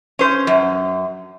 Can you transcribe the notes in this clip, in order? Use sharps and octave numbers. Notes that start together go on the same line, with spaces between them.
C#4 C5
F#2